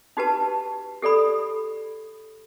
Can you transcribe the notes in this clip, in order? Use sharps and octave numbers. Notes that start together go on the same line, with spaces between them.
D#4 F#4 G4 B4 A5
G4 A4 D5 B5 D#6